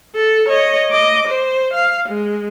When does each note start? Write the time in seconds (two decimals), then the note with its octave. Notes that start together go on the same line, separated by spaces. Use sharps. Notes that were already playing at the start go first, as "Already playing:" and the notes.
0.15 A4
0.49 C#5 D#5
0.91 D#5 D6
1.27 C5
1.73 F5
2.08 G#3